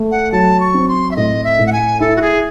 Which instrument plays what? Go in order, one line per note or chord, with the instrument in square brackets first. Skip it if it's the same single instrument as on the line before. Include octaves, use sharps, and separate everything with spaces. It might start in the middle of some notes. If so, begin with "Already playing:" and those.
Already playing: [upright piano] A3
[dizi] F#5
[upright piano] F#3 [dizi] A5
[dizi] C#6
[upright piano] C4
[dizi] C6
E5
[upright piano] A2 [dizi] D#5
[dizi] E5
[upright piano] A2
[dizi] F#5
G#5
[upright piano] E4 [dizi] A4
[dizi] F#4
G#4